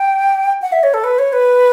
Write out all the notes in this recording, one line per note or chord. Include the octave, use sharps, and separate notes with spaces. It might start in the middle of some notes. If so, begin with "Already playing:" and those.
Already playing: G5
F#5
E5
C#5
A4
B4
C#5
B4